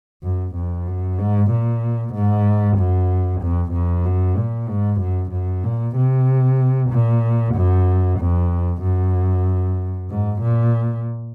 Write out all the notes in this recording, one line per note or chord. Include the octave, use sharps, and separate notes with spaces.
F#2
F2
F#2
G#2
A#2
G#2
F#2
F2
F2
F#2
A#2
G#2
F#2
F#2
A#2
C3
A#2
F#2
F2
F#2
G#2
A#2